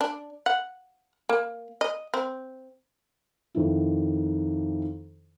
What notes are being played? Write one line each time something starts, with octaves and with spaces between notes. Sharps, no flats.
D4
F#5
A#3
D#5
C4
F2 D#3 E4